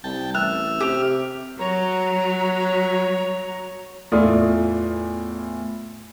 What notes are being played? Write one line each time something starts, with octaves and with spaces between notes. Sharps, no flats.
C2 G5 A5
A1 E5 F6 F#6
C3 G4
F#3 C#5 A#5
E2 A2 F4 D5 D#6